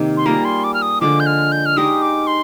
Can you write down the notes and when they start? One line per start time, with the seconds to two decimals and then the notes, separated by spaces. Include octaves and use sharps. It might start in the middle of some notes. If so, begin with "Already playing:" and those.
Already playing: C3 D#3 A#3
0.17 C6
0.25 G3 A#3 F4 G#4 A#5
0.45 C6
0.64 D6
0.74 F6
0.82 D#6
1.01 D3 F3 G#3 D6
1.20 G6
1.26 F6
1.52 G6
1.66 F6
1.77 G#3 D#4 G4 A#4 D#6
2.02 D6
2.27 C6